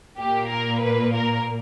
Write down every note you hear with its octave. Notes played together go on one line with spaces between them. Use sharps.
A#2 A#3 G4
A#4
B4
A#4